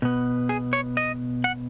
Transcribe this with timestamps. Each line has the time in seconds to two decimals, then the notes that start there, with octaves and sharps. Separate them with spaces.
0.02 B2 B3
0.49 G#4
0.73 C#5
0.97 D#5
1.44 F#5